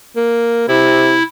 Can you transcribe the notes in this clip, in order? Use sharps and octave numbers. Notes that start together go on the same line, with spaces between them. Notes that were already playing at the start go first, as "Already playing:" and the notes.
A#3
C3 E4